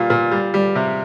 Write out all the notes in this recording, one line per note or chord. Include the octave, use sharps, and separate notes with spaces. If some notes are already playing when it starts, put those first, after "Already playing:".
Already playing: A#2 G3 F4
A#2
G3
G3
C3